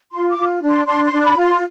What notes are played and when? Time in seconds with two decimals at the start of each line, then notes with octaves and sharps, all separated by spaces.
0.13 F4 C6
0.30 D6
0.37 F4
0.62 D4
0.69 C6
0.87 D4 C6
1.05 C6
1.11 D4
1.23 B5
1.36 F4
1.42 C6